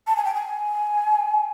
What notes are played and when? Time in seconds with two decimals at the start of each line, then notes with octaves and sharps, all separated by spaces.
0.07 A5
0.16 G#5
0.25 G5
0.34 G#5